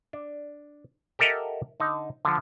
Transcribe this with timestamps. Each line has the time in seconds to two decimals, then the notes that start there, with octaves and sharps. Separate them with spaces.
0.13 D4
1.19 G4 A4 A#4 D#5 E5 F#5
1.80 D3 D#4
2.25 D3 F3